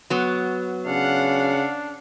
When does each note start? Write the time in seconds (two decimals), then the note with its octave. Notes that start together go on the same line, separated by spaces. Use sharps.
0.10 F#3 B3
0.86 C#3 D4 F5 F#5